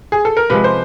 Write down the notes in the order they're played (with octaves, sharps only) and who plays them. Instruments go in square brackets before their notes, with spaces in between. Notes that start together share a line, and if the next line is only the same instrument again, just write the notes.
[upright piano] G#4
A4
A#4
[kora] C3 F3 G#3 [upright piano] B4
[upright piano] C5